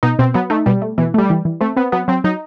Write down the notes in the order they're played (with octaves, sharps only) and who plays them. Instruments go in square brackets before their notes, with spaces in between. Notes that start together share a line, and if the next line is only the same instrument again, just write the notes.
[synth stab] B2 [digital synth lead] D#4
[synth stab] B2 [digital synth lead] C4
[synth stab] F#3 [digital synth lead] B3
[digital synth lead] A3 [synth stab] D#4
[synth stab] B2 [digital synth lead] G3
[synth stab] A3
[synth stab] B2 [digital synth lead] E3
[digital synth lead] G3 [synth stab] A3
[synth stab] E3
E3
[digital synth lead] A3 [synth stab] C4
[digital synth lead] B3 [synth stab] C4
[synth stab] F#3 [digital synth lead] B3
[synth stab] F#3 [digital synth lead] C4
[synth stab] F#3 [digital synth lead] D#4